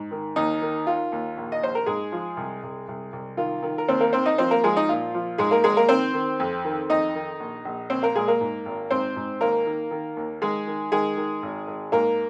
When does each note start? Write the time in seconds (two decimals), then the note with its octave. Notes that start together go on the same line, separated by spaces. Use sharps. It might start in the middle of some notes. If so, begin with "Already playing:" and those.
Already playing: G#2
0.11 D#3
0.36 D#2 D#4
0.62 D#3
0.86 D#3 F4
1.12 D#2
1.37 A#1
1.52 D#5
1.62 A#1 C5
1.75 A#4
1.86 G#2 G#3 G#4
2.12 F3
2.37 C2
2.63 C2
2.88 C2
3.13 C2
3.37 D#3 F4
3.62 D#3
3.78 A#4
3.88 D#2 C4 C5
4.00 A#3 A#4
4.13 D#3 C4 C5
4.26 D#4 D#5
4.38 F3 C4 C5
4.51 A#3 A#4
4.63 F3 G#3 G#4
4.77 D#4
4.88 A#2 F4
5.14 F3
5.38 G#2 G#3 G#4
5.51 A#3 A#4
5.64 G#1 G#3 G#4
5.77 A#3 A#4
5.89 D#3 C4 C5
6.14 D#3
6.40 F2
6.65 D#3
6.90 F2 D#4 D#5
7.15 D#3
7.40 A#1
7.65 A#1
7.90 A#1 C4 C5
8.03 A#3 A#4
8.15 A#2 G#3 G#4
8.28 A#3 A#4
8.41 G#2
8.65 G#1
8.91 G#2 C4 C5
9.16 G#2
9.41 D#2 A#3 A#4
9.66 D#3
9.91 D#3
10.16 D#2
10.41 D#3 G#3 G#4
10.67 D#3
10.92 D#3 G#3 G#4
11.17 D#3
11.42 G#1
11.67 G#1
11.92 G#2 A#3 A#4